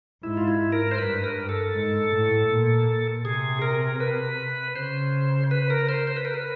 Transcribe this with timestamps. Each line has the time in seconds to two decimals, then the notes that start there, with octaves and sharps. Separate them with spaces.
0.23 G#2 E4
0.37 F4
0.48 E4
0.72 A#4
0.91 C5
0.98 G2 B4
1.24 A#4
1.49 A4
1.74 G#2
2.11 A2
2.49 A#2
3.25 C3 G#4
3.62 A#4
4.00 B4
4.75 C#3 C5
5.51 B4
5.70 A#4
5.89 C5
6.07 C5
6.16 B4
6.25 A#4
6.34 B4